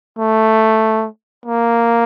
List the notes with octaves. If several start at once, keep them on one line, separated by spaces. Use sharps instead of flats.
A3
A#3